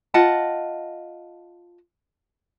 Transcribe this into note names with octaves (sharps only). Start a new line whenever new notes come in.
F4 D#5 F#5 A5